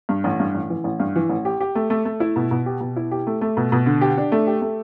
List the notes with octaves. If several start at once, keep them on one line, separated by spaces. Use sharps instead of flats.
G2
A1
G2
A1
E3
A1
G2
E3
A1
G4
G4
A3
A3
A3
E4
B2
B2
G4
B2
E4
G4
A3
A3
B2
B2
D3
G4
D4
A3
G4
A3